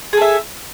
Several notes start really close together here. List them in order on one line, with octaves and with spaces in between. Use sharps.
G#4 A4 E5